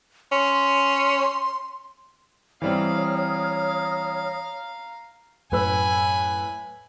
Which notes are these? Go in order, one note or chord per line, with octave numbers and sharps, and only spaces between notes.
C#4 C6
E3 G3 C4 C#5 F5 A#5 D#6 F6
F#2 A2 B4 G#5 B5 E6